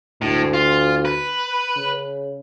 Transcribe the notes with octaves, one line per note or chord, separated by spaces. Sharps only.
D2 A2
F4
B4
C#3